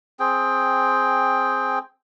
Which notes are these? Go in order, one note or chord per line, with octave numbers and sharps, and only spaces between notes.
C4 G#4 G5